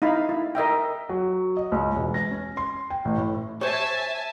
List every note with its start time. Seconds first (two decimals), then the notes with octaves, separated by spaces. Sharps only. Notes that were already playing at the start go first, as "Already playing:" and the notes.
0.02 D#4 E4 F5 B5
0.29 E4
0.55 A#4 D#5 E5 G5
1.09 F#3
1.57 D#5
1.72 C#2
1.96 E1
2.14 A#6
2.31 C#4
2.57 C6
2.90 G5
3.05 A1
3.18 A2
3.61 C5 C#5 E5 G#5 A5